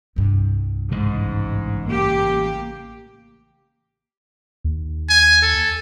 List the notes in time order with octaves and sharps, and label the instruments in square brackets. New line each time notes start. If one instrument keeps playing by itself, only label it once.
[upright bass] C2 G2
[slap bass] A1 C#3 G#3 [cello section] G#2
[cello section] A#3 G4
[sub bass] D#2
[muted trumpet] G#5
A4